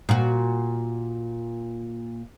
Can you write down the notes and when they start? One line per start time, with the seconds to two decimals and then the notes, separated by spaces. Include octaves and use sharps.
0.09 A#2 F#4